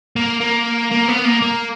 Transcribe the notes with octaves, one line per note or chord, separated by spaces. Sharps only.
A#3
A#3
A#3
B3
A#3
A#3